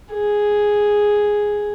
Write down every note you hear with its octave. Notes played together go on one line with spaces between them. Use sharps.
G#4